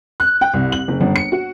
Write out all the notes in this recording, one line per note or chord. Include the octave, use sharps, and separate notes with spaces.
F#6
G5
C2
F#7
F#1
G1
C#7
F#4